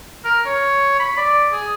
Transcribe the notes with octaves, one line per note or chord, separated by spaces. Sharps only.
A#4
C#5
B5
D5
G#4